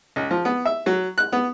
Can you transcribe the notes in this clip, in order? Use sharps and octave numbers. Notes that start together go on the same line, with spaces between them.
C#2
F3
B3
E5
F#3
F#6
B3